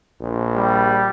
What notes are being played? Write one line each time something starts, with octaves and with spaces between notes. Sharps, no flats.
A#1
G3